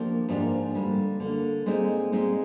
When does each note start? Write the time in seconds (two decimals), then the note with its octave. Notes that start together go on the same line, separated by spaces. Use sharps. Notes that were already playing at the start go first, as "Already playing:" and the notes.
Already playing: F3 A#3 D4 G4
0.29 G#2 F3 A#3 D4 G4
0.74 D3 G3 A#3
1.20 D3 G3 A#3
1.66 A#2 G#3 C4 D#4
2.12 A#2 G#3 C4 D#4